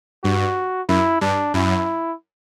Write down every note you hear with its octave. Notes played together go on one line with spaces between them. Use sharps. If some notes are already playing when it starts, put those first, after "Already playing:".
G2 F#4
F#2 E4
G2 D4
F#2 E4